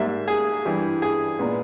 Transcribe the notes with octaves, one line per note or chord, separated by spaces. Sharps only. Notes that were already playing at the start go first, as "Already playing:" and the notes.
Already playing: G#2 G3 A#3 E5
G#4
G2 E3 G3
G#4
A#2 G#3 B3